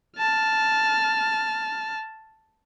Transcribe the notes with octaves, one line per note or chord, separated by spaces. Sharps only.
A5 F6